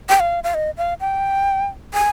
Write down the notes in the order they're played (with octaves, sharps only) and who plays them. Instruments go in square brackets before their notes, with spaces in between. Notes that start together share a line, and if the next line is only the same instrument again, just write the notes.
[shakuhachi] G5
F5
F5
D#5
F5
G5
G#5